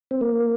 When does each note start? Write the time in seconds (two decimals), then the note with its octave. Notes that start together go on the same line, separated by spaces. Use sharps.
0.11 C4
0.21 A#3